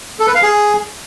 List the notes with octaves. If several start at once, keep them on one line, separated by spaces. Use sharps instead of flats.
A4
B4
F5
G#4